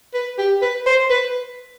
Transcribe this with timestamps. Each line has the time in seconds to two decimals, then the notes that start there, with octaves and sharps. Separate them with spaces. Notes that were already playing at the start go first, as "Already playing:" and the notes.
0.14 B4
0.38 G4
0.62 B4
0.86 C5
1.10 B4